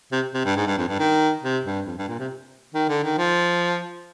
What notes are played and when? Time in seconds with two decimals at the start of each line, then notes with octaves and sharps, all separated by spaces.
0.12 C3
0.34 C3
0.45 G2
0.57 G#2
0.67 G2
0.78 F2
0.89 G2
0.99 D#3
1.43 C3
1.65 G2
1.87 F2
1.98 G2
2.08 A#2
2.19 C3
2.74 D#3
2.89 D3
3.03 D#3
3.18 F3